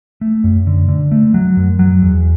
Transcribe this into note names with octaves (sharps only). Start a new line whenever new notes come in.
A3
F#2
D3
D3
A3
F#3
F#2
F#3
E2